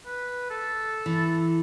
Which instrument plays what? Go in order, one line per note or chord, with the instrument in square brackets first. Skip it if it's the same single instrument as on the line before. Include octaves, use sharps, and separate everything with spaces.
[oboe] B4
A4
[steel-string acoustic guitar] E3